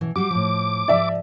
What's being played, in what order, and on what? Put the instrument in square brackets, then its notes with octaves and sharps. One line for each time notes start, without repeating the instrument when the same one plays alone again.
[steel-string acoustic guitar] B2 E3
[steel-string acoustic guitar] G3 F#4 G4 [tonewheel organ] D6
[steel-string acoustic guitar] A2 F3
[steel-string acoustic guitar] G#2 F3 [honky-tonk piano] D5 E5